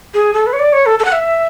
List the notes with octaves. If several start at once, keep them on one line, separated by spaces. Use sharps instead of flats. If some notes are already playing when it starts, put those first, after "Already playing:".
G#4
A4
B4
C#5
D5
C#5
A4
A4
F#5
E5